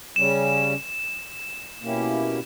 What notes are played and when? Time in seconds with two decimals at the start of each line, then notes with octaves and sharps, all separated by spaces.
0.16 C#3 G3 C#4 E7
1.82 B2 A#3 C#4 E4 G4